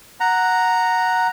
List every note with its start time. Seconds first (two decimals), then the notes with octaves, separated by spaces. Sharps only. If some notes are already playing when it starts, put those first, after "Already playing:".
0.20 F#5 A#5